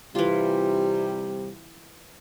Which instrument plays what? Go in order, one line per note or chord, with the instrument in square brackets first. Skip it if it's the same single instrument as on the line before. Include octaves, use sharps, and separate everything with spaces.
[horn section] C3 G3 [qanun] E3 F4